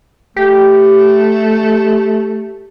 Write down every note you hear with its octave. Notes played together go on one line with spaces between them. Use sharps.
A3 G4